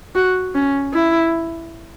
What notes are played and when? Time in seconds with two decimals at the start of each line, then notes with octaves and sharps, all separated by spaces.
0.15 F#4
0.55 C#4
0.94 E4